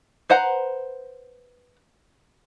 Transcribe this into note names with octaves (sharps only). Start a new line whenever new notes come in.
B4 C5 F#5 A#5